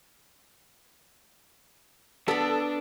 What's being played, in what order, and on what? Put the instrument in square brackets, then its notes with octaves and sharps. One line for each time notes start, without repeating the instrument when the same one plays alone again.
[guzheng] B3 B5 [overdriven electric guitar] D4 [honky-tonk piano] A4